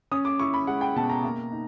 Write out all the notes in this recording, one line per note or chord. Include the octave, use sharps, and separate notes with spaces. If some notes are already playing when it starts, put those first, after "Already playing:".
C#4 D#6
D6
E4 C#6
B5
G#3 F#5
G5
B2 A5
A#5
A#3
D#4